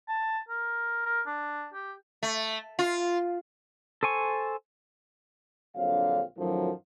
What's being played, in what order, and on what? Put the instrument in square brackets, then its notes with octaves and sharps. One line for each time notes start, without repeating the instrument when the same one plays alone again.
[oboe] A5
A#4
A#4
D4
G4
[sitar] A3
F4
[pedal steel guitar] A4 C5 G#5 C#6
[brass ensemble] A#1 D3 F#3 C4 F5
F#2 A2 D#3 F3 F#3